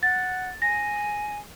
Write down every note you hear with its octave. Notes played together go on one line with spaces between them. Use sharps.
F#5 A6
G#5 A#6